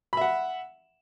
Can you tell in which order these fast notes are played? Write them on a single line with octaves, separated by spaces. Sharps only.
B5 E5 F#5